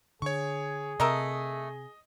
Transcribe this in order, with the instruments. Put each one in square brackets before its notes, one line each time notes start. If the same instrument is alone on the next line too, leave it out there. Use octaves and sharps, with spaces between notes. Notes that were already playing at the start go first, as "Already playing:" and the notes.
[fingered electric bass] D3 [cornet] G#4 [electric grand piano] C#5 C#6
[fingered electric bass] C3 [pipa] A3 A#4 E5 [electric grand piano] D#5